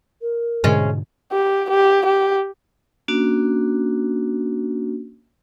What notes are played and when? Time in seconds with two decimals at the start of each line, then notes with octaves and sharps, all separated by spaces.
0.22 A#4
0.64 G#2 B2 D3 G#3 C#4
1.32 G4
1.70 G4
2.05 G4
3.08 A#3 C#4 D4 F#4